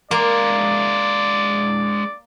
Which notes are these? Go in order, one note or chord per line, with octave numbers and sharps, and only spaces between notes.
G#3 A#3 D4 D5